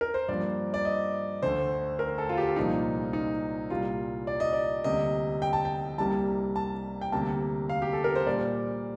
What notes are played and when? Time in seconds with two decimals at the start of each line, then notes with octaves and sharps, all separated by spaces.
0.01 A#4
0.14 C5
0.28 G2 F3 A#3 D5
0.74 D5
0.85 D#5
1.42 D2 D3 A3 C5
1.99 A#4
2.18 A4
2.29 F4
2.38 G4
2.56 C2 A#2 F3 A#3 D#4
3.13 D#4
3.70 C2 A#2 G3 A#3 F4
4.27 D5
4.40 D#5
4.53 D5
4.84 D2 C3 G3 A#3 D#5
5.42 G5
5.53 A5
5.65 G5
5.98 C2 C3 G3 A#3 A5
6.56 A5
7.01 G5
7.12 D2 C3 G3 A#3 A5
7.70 F5
7.82 G4
7.93 A4
8.04 A#4
8.15 C5
8.26 A#2 G3 A#3 D5